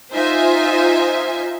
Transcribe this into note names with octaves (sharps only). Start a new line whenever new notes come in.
D#4 F4 C5 E5 G#5